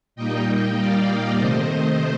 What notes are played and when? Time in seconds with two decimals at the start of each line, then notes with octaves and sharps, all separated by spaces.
0.16 A#2 G3 A#3 D#4 D#5 G5
0.77 D5 F5
1.38 C3 D#3 A3 C5 D#5